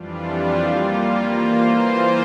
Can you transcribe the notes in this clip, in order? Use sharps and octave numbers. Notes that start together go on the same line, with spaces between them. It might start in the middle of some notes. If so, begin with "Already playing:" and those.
Already playing: F2 E3 G3 D4 F4
G3 A#3 F4
E3 A#3 F4 C5